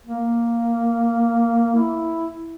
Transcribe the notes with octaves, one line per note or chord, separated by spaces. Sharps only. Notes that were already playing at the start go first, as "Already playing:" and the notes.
A#3
E4